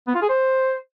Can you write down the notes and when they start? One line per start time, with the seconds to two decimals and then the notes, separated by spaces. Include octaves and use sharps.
0.07 B3
0.15 F4
0.22 G#4
0.29 C5